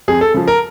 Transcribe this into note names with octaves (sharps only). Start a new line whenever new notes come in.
F2 G#4
A4
C#3 F3
A#4